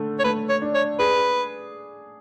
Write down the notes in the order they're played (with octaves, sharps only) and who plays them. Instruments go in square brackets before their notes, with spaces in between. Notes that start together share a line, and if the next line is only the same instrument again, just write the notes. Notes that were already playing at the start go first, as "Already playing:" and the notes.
Already playing: [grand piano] D3 A3
[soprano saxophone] C#5
[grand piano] A3 [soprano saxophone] B4
[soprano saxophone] C#5
[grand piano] D4
[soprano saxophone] C#5
[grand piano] G#4 [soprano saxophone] B4